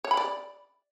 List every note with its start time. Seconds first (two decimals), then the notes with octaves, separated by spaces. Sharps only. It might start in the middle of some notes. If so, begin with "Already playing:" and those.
0.04 C#5
0.11 B5
0.17 D5